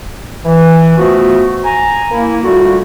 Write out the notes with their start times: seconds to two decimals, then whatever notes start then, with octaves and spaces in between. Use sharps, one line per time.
0.45 E3
0.98 F3 A3 B3 F4 F#4
1.64 G#5 A#5
2.10 A#3 E4
2.44 D3 G3 A3 F4 F#4